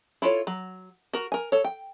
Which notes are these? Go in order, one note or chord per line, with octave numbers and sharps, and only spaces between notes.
E4 F4 A4 C#5
F#3
F#4 A#4
A#4 G#5
A4 C#5
G5